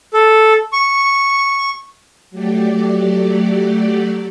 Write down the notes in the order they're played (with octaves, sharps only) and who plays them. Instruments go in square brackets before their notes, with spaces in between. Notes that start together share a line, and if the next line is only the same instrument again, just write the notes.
[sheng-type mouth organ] A4
C#6
[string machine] F#3 A3 G4 D5